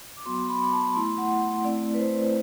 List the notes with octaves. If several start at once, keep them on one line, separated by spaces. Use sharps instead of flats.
D6
F#3 B3 F#4 C6
B5
A5
A3 E4 C6
F#5
A3 C4 E4 D5
B4
C5